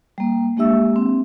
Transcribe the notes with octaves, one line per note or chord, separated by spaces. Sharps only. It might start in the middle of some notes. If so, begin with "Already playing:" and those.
G3 A#3
G#3 A#3 D4 G4 E5 E6
C4